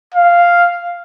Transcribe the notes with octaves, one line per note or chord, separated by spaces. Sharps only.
F5